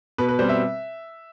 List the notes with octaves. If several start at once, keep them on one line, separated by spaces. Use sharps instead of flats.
B2 B4
B4
G3 C4 C5
E5